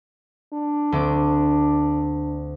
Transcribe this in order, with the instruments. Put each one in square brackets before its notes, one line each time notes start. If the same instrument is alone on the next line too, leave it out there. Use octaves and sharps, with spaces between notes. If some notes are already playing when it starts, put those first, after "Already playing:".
[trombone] D4
[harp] D2 C4 D6